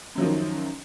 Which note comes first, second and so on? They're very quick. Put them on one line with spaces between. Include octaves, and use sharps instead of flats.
F#2 F#3 F3 D#3